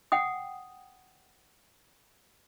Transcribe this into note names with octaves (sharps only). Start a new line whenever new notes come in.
F#5 G5 D#6